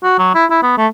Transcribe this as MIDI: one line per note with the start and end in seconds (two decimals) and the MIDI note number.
0.04 0.17 66
0.19 0.33 54
0.35 0.45 64
0.51 0.59 64
0.63 0.78 59
0.78 0.87 57